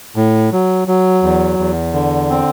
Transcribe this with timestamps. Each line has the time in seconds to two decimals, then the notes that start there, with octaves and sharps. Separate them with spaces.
0.16 A2
0.52 F#3
0.88 F#3
1.23 E2
1.58 E2
1.94 D3
2.30 C4